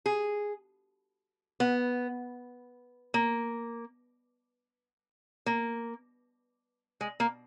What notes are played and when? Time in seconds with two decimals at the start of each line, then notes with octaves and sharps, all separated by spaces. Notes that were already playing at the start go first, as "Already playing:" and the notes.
0.06 G#4
1.60 B3
3.14 A#3
5.46 A#3
7.01 G#3
7.20 A#3